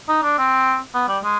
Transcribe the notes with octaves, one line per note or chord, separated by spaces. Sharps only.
D#4
D4
C4
B3
G3
G#3